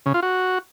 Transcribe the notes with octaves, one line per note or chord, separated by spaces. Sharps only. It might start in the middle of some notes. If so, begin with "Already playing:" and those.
C#3
F4
F#4